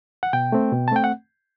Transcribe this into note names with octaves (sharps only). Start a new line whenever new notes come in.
F#5
B2 G5
A3 C4
B2
A5
A3 C4 G5
F#5